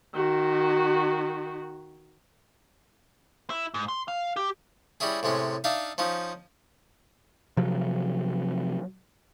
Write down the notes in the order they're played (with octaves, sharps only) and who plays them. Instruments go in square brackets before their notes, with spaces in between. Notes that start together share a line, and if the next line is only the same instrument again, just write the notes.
[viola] D#3 F#4
[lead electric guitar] E4
G#2
C6
F5
G4
[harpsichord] G3 C#4 E4 G#4
A2 C3 G#3 C#4
D4 D#4 E5 F5
F3 C#4 D#4
[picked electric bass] C3 F3 F#3